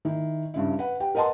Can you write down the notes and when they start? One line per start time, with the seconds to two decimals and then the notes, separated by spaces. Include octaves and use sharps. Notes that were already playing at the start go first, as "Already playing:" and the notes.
0.05 D#3 E4
0.54 G2 C#3 E4
0.79 B4 F#5
1.00 G4 G5
1.15 A#4 B4 D#5 F#5 A5 C6